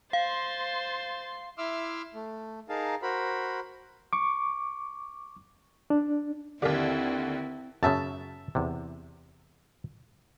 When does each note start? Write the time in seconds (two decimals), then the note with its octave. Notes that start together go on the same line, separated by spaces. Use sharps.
0.13 C5 F5 C6 A6
1.58 E4 E5 C6 D6 E6 F6
2.14 A3
2.69 D#4 G#4 A#4 F5 A5
3.02 F#4 A#4 C5 B5
4.13 C#6 D6
5.90 D4
6.62 D#2 D3 C4 E4 G4 A#4 E5
7.83 F#2 C#3 E5 A5
8.55 E2 C3